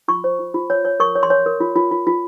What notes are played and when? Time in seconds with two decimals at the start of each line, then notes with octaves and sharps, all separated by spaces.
0.08 F4 C#6
0.24 C5
0.39 F4
0.54 F4
0.70 C#5
0.85 C#5
1.00 A#4 C#6
1.15 C#5
1.23 C6
1.30 C#5
1.46 A#4
1.60 F4
1.76 F4
1.91 F4
2.07 F4